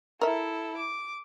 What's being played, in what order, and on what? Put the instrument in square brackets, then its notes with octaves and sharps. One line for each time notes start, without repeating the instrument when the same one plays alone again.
[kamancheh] E4 A4 [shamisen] A#4 E5
[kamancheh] D6